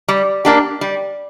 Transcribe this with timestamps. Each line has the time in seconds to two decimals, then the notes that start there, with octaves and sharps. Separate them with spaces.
0.08 G3
0.45 A#3 D4 G4
0.81 G3